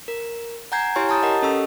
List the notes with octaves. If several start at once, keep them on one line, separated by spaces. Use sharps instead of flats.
A#4
F#5 G#5 A#5 G6 G#6 C7
E4 G4 C#5 G#5 C6 C#6
A5 A#5 D#6 G6 A6
G4 A#4 D#5 F#5
C#4 A4 D#5 C#6 E6